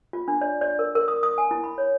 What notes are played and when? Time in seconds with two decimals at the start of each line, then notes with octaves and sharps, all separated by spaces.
0.13 F4
0.28 D4
0.41 D5
0.61 D5
0.79 A#4
0.95 A#4
1.08 D#6
1.23 D#6
1.38 G#5
1.51 E4
1.64 B5
1.78 C#5